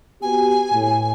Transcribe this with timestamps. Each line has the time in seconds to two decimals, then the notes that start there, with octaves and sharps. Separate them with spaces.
0.22 B3 F#4 G4 G#5
0.73 A2